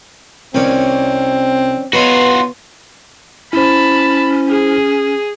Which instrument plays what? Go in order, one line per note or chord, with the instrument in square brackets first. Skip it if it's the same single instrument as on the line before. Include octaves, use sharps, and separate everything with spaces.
[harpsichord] C2 D#3 C#5 [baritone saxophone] C4 [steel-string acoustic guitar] C#4 D5
[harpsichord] B3 D#4 C#5 [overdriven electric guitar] F4 F#4 [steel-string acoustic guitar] B4
[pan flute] C#4 [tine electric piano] E4 C5 [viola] A5 B5
[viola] G#4